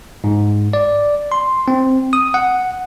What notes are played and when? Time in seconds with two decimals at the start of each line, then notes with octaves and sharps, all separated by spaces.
0.24 G#2
0.73 D5
1.32 C6
1.68 C4
2.13 D#6
2.34 F#5